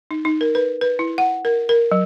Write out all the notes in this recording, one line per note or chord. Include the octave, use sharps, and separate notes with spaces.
D#4
D#4
A#4
B4
B4
E4
F#5
A#4
A#4
F#3